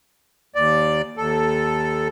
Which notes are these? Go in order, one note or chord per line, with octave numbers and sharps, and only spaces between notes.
D#2 D5
D#2 A4